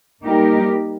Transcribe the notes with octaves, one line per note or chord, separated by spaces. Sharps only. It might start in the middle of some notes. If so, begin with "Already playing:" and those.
G3 A#3 D#4 G4 A#4